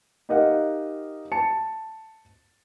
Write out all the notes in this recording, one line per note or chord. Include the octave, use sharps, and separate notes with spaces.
D#4 G4 A#4 D#5 F5 F#5
A5 C#7